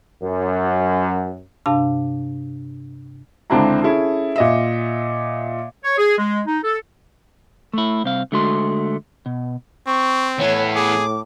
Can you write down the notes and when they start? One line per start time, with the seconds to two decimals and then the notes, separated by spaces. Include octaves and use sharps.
0.23 F#2
1.66 G2 C3 D4 F5 A5
3.50 C#2 D3 C4 D4 E4 A#5
3.83 C#4 E4 G#4 A4
4.36 A#2 D#5 E5
5.84 C#5
5.98 G#4
6.18 G#3
6.47 D#4
6.64 A4
7.74 A3 E4
8.04 C2 C4 F5
8.32 D3 G#3 A3 F#4 C6
9.26 B2
9.87 C4 C#6
10.39 A2 E3 B3 C#5
10.76 G#4 D6